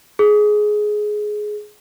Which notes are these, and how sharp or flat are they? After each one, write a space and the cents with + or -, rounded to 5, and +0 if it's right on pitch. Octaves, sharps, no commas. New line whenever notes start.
G#4 +15